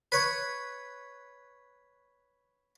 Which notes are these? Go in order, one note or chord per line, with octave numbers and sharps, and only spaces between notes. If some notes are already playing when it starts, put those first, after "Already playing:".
B4 C#5